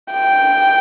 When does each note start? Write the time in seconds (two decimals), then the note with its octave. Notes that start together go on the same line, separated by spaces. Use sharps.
0.13 G5